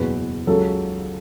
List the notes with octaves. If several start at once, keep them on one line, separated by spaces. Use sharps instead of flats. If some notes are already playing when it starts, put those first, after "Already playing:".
Already playing: F#1 E2 B2 F#3 B4
C#2 C#3 F#3 A4